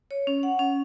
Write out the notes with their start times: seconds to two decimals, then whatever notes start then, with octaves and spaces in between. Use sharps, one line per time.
0.11 C#5
0.27 C#4
0.43 F#5
0.59 C#4